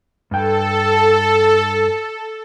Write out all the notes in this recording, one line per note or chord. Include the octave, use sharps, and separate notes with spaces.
G2 A4 G5